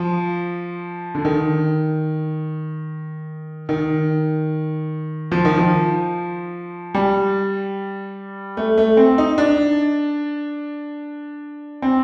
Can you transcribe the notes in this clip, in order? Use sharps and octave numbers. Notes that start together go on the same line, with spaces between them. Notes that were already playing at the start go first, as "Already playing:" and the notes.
Already playing: F3
D3
D#3
D#3
F3
D#3
F3
G3
A3
A3
C4
D#4
D4
C4